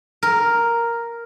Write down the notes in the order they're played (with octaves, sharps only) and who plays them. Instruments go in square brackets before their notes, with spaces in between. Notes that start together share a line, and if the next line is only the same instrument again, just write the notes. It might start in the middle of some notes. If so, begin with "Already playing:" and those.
[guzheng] A#4